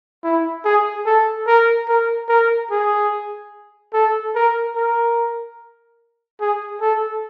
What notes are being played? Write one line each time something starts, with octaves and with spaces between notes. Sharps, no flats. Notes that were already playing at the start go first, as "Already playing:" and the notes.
E4
G#4
A4
A#4
A#4
A#4
G#4
A4
A#4
A#4
G#4
A4